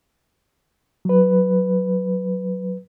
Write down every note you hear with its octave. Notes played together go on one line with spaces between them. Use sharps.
F#3 B4